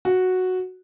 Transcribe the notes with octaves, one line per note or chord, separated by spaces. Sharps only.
F#4